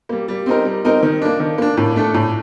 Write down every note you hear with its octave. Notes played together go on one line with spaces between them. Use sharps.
G3 A#3
G3
C4 D#4 A#4
G3
C4 D#4 A#4
D#3
A#3 D4
D#3
A#3 D4
A2
A3 D4 A4
A2